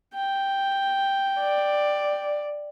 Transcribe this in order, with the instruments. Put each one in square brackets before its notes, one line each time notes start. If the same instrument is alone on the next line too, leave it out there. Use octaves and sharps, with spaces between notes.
[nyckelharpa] G5
[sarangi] D5